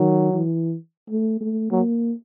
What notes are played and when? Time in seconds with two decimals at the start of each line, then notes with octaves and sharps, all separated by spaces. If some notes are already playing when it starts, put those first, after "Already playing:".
Already playing: D#3 F#3
0.33 E3
1.10 A3
1.41 A3
1.71 F#3 A#3